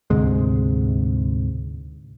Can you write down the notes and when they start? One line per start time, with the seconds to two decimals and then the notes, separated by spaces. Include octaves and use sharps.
0.10 D2 G#2 C3 G#3